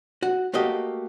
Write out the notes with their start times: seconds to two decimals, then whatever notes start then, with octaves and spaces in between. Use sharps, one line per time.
0.22 F#4
0.53 A3 A#3 F#4 G4 D#5